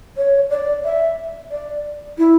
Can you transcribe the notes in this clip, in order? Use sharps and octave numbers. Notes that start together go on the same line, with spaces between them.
C#5
D5
E5
D5
E4